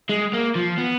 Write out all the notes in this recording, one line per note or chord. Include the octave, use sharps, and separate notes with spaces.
G#3
A#3
F3
B3